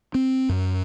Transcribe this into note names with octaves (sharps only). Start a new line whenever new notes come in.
C4
F#2